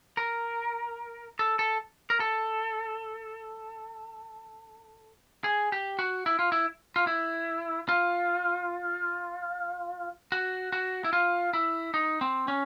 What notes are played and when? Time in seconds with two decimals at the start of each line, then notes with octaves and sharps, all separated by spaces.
0.17 A#4
1.39 A4
1.59 A4
2.10 A#4
2.20 A4
5.44 G#4
5.72 G4
5.99 F#4
6.26 E4
6.39 F4
6.52 E4
6.96 F4
7.07 E4
7.89 F4
10.32 F#4
10.72 F#4
11.04 E4
11.13 F4
11.53 E4
11.94 D#4
12.21 C4
12.48 C#4